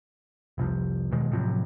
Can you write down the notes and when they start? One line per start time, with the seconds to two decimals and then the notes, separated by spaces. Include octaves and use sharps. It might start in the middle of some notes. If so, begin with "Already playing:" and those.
0.58 F1 C2 F3
1.11 E2 B2 D#3 G#3
1.31 A2 C3 F3 F#3